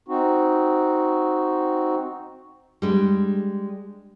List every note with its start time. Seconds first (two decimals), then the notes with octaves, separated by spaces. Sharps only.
0.08 C4 D#4 F#4
2.82 G3 G#3 D4